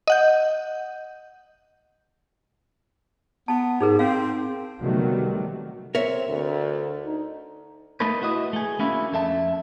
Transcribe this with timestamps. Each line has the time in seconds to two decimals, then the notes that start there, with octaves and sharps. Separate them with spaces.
0.07 D#5 F#5 G6
3.48 B3 A5
3.80 G#2 D#4 G#4 A#4
3.99 C4 F5
4.80 C3 D#3 F#3 G3 A3 B3
5.95 C4 A#4 C#5 E5
6.28 D2
7.05 D#4
8.00 A3 A#3 D#4 A4 B4
8.22 E4 F#4 B4 D#5
8.53 A3 G#4
8.79 A3 A#3 C#4 D4 E4 F#4
9.13 F2 A4 E5 A5